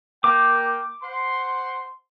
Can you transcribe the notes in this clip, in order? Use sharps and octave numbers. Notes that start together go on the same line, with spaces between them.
A#3 G5 D6
C5 F#5 C6